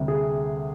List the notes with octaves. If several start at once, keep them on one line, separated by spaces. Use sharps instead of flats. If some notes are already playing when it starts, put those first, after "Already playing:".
Already playing: D2 C3 G3
G#4